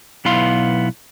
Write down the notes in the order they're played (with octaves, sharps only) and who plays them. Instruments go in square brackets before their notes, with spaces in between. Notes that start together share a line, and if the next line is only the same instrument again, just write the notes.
[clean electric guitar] B1 B3 E4 F5 C6